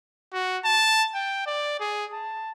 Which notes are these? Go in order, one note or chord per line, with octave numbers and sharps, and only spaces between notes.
F#4
A5
G5
D5
G#4
A5